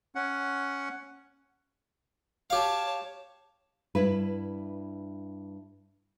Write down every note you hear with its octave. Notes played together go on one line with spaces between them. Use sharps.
C#4 F#5
G4 C#5 F5 A5
G2 B2 E4 B4